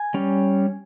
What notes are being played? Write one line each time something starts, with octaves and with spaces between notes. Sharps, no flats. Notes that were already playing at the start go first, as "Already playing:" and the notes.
Already playing: G#5
G3 C#4